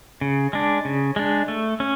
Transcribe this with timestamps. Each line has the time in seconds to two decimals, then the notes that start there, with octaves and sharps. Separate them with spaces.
0.21 C#3
0.53 G#3 D4
0.85 C#3
1.16 G#3 D4
1.48 A3
1.80 C#4